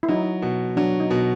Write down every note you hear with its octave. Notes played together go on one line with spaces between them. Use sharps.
E4
F#3 D#4
B2
F#3 D4
D#4
B2